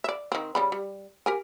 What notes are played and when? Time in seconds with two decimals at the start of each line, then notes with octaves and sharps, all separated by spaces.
0.04 D5 E5
0.32 D#3 C4
0.55 C#3 G3 B5
0.72 G3
1.26 G4 A#4 G#5